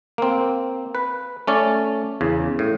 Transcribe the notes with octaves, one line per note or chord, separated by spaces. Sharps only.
A#3 C4
B4
A3 C#4 D5
E2 C#3
A2